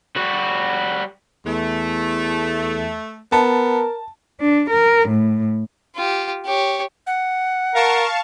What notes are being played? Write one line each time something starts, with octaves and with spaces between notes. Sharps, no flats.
G3 F#4
E2 A3
B3 A#4 A5
D4
A#4
A2
F4 G4
G4 C#5
F#5
A#4 F5 A5 C#6